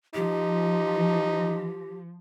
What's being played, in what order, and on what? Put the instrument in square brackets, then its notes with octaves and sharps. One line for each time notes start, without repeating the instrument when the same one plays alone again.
[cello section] F3 [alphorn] D#4 [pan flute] G4